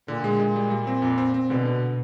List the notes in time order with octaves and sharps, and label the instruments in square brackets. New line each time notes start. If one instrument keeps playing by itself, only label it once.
[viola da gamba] A#2 [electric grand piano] D3
[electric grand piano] G#3
G#3
G3
G3
C4
F2
C4
C4
[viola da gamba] B2 [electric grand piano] D3
[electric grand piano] D3